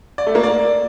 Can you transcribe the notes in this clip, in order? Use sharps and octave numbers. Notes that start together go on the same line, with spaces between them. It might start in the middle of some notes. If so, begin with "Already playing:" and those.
D5
A3
A#3
D5